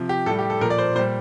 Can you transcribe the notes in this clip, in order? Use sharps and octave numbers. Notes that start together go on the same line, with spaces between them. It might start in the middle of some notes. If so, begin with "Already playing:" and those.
Already playing: C3 F3
G4
A2 G3 A4
G4
A4
A#2 F3 A#4
D5
C5
A#2 G3 C5